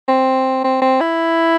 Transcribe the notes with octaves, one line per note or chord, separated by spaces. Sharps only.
C4
C4
C4
E4